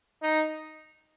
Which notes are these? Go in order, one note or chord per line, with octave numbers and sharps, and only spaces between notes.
D#4